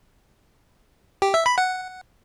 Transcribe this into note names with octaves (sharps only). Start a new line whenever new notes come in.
G4
E5
B5
F#5